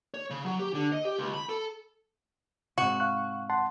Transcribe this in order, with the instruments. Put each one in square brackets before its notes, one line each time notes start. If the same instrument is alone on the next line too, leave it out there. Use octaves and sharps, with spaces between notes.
[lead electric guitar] C#5
C#3
F#3
G4
D3
D#5
G4
C#2
B5
A4
[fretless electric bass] G#2 C3 [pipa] F#4
[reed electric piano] F5 C#6 F#6
F#5 A5 C6